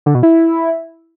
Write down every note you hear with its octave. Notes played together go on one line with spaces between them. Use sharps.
D3
B2
E4